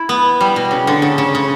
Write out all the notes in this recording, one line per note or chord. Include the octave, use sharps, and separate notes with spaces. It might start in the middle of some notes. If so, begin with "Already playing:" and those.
Already playing: E4
B3
G3
B2
C#3
D3
C#3
C#3
C#3